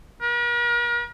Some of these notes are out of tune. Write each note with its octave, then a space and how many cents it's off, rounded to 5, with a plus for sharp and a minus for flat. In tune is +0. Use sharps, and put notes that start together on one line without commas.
A#4 +45